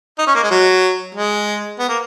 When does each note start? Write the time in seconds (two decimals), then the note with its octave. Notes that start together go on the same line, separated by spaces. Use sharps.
0.18 D#4
0.27 C#4
0.35 A#3
0.43 G#3
0.51 F#3
1.15 G#3
1.79 B3
1.89 A#3